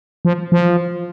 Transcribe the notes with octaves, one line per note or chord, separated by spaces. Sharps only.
F3
F3